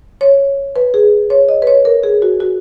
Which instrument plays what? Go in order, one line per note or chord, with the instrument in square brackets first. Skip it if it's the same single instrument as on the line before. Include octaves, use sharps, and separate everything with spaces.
[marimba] C#5
B4
G#4
C#5
D#5
B4
C#5
A#4
G#4
F#4
F#4